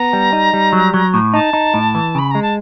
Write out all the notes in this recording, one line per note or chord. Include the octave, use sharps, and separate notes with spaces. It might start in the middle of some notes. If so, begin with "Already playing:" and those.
Already playing: B3 A#5
G3
D#4
G3
F#3
F#3
A2
D#4 A5
D#4
A2
E3
C#3 B5
G#3 A#5
A5